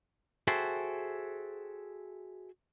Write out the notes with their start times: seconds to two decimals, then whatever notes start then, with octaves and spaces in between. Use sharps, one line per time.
0.47 F#4 G#4 A4 C5 E5 G5